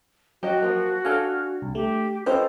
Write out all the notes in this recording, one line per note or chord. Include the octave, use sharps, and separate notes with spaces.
F#3 F#4 G4 D#5 G5
F3 A#3
D4 A4 F5 G5 G#5 F6
C2
A3 G4
C#4 F4 A4 B4 C5 D#5 G5